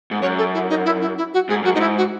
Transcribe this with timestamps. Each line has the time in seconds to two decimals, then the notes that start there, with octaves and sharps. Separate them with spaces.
0.11 G#2
0.22 F#2 C#5
0.38 A4
0.54 E4
0.70 D#4
0.85 E4
1.01 E4
1.18 E4
1.34 F#4
1.49 G#2 G#4
1.62 F#2 F#4
1.75 G#2 D#4
1.81 E4
1.98 F#4